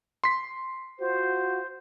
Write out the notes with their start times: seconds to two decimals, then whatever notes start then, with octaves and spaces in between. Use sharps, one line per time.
0.24 C6 B6
0.99 F4 F#4 C5